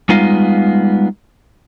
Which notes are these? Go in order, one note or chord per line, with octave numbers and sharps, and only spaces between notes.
G3 G#3 B3 D#4 F4 F5